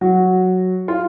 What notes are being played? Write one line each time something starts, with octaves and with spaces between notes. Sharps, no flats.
F#3 F#4
F4